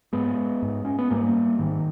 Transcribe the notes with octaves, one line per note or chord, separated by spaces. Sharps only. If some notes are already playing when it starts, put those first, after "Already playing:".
G#2 G#3 B3
G#2
C#4
B3
G#2 G3 A#3
G#2 D#3